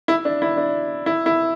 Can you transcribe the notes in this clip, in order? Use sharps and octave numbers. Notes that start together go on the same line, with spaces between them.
E4
D4
E4
D4
E4
E4